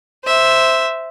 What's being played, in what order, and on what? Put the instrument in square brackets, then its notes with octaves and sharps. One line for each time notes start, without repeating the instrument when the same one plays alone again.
[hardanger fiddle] C5 E5